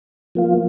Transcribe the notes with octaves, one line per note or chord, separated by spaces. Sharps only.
F3 A#3 F4